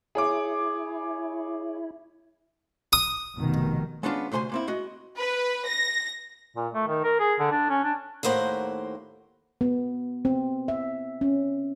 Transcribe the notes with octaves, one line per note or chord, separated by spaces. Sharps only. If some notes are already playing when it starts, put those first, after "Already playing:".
E4 G#4 C#5 D6
D#6
F1 B2 D#3
G#3 B3 C#4 D4 F4
D2 C3 C5 G#5 C6
A#3 C4 E4
G#3 F#4 D#5
B4
A#6
A#2
A3
D#3
A#4
G#4
D3
D4
C#4
D4
D#2 A2 A#3 C5 F#5
B3
C4
E5
C#4